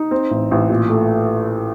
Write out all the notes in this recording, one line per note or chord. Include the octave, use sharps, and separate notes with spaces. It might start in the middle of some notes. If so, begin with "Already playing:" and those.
Already playing: D#4
C4
A1
A1
A#2
A3